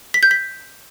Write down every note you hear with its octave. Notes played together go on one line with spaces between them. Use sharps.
B6
G6
B6